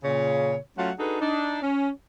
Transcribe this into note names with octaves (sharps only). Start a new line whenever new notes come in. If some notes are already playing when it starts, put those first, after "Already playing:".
A#2 C#3 C#5
F#3 A3 C#4 F4 F5 F#5
D4 D#4 F#4 G#4 A4 B4
D4 D#4
C#4